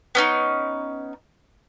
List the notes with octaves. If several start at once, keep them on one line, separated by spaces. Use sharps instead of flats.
B3 C#4 D#4